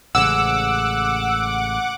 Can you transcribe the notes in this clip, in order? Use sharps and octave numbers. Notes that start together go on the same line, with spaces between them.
A1 C#3 G#3 F#5 D6 E6